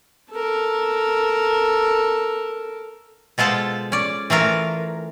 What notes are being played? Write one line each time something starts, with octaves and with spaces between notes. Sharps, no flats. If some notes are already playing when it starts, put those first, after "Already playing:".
A4 A#4
B2 G#3 F4 A4 C5 A5
C#4 D5
E3 A3 F4 A#4